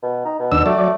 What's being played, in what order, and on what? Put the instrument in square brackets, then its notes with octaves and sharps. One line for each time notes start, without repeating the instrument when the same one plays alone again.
[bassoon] B2
D#4
B2
[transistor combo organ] D#2 D4 E6
[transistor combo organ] F#3 D5 [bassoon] A3